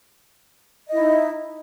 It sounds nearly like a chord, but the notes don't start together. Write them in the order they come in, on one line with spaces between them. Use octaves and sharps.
D#5 E4 D#4